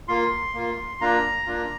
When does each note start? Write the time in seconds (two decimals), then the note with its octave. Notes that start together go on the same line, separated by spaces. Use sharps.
0.08 A#3 F4 C6
0.54 A#3 F4
1.01 A#3 D4 F4 A#5
1.47 A#3 D4 F4